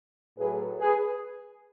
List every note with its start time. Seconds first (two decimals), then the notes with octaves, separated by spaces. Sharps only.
0.37 A2 F#3 A3 G#4 B4
0.79 G#4 B4